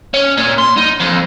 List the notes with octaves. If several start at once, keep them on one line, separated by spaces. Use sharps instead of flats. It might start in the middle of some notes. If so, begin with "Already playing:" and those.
C#4
A#2
C6
D#4
F2